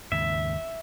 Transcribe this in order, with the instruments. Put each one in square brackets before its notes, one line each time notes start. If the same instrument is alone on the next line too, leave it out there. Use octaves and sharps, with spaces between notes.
[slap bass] D#2 G#2 C#3 [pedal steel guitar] E5